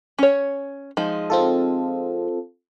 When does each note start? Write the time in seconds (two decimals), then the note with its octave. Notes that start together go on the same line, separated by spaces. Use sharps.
0.19 C#4 C#5
0.97 F3 G#3 D#4
1.30 C4 F4 A4